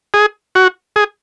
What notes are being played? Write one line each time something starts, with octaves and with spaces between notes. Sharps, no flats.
G#4
F#4
G#4